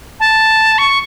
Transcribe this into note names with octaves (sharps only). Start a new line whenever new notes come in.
A5
C#6